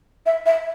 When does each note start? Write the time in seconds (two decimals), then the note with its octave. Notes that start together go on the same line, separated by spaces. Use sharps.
0.26 E5
0.45 E5